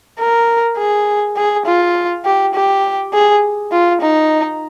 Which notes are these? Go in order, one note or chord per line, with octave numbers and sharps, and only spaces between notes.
A#4
G#4
G#4
F4
G4
G4
G#4
F4
D#4